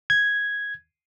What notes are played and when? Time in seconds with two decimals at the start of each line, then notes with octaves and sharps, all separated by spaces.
0.10 G#6